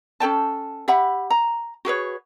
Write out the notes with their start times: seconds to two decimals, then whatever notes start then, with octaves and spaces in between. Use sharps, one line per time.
0.20 C#4 A4 G5 A5
0.88 G4 E5 F#5 B5
1.30 A#5
1.85 F#4 G#4 B4 C#5